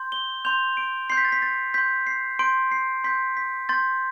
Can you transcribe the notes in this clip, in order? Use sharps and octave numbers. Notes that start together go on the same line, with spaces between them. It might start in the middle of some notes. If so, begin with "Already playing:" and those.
Already playing: C6 G6
G7
C6 G6 F7
D7
C6 G6 C7
B6
A6
B6
A6
C6 G6 B6
C7
C6 G6 D7
C7
C6 G6 B6
B6
C6 G6 A6